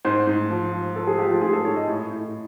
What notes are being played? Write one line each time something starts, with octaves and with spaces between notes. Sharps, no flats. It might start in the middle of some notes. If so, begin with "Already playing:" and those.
G#2 C5
G#2
F3
F3
F3 A4
G#4
F3 G4
F4
G#2 G#4
A4
G#2 C#5
D#5
A2
A2